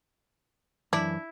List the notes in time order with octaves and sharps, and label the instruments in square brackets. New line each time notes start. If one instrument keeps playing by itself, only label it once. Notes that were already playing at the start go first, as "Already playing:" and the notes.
[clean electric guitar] F#2 E3 [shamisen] D4 [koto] E4